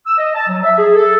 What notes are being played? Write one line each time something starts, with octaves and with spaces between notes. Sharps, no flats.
E6
D#5
A5
F#3
E5
G#4
A4